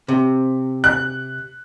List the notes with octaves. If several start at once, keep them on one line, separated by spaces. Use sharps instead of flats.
C3
F#6